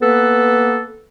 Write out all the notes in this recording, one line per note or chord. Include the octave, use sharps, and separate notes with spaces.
A#3 B3 A4 B4